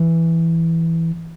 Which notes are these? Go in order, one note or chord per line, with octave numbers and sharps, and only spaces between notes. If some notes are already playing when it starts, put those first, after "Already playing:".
Already playing: E3